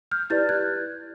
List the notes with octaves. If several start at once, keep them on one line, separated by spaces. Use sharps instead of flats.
F6 G6
E4 G4 B4 D5 G6 A6
F#6 G#6